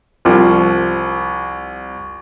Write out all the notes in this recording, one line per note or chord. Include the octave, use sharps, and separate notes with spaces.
C2 F3